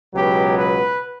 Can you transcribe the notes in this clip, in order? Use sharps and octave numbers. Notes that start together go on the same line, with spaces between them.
C#2 B2 F#3 B3 G4
B4